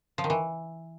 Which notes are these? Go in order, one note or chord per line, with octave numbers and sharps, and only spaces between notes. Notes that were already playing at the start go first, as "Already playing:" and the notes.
F3
D#3
E3